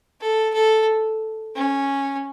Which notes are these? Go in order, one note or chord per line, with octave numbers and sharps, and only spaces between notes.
A4
A4
C#4